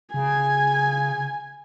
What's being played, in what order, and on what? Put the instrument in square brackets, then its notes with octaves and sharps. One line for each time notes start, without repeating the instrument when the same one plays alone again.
[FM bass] C#3 [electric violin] G#5